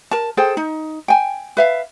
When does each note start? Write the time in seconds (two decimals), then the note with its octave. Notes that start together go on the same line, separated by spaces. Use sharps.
0.11 A#4 A5
0.37 G#4 A4 C5 G5
0.57 D#4
1.08 G5 G#5
1.57 B4 E5 F5